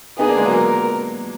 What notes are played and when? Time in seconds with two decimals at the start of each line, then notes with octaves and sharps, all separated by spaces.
0.18 B3 D#4 G#4
0.27 A#3 D4
0.37 G#3 B3
0.45 F#3 A#3
0.55 A#4